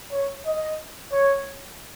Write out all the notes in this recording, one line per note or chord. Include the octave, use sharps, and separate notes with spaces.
C#5
D#5
C#5